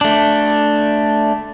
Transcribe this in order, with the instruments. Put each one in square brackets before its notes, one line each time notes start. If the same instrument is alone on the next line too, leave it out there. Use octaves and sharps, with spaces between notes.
[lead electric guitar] A3 D4